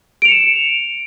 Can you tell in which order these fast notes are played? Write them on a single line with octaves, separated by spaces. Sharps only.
D7 F7 C#7 E7